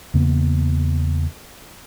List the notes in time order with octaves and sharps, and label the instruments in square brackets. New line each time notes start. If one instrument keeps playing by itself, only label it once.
[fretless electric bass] E2 C#3 A#3 B3